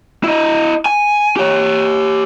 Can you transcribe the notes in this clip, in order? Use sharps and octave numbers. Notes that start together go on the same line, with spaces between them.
E4 D#5
G#5
G4 C#5